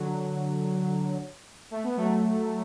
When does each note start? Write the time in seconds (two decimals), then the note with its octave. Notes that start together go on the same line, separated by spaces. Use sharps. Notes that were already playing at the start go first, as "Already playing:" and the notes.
Already playing: D3 F#3
1.71 A3
1.84 B3
1.96 F#3 A3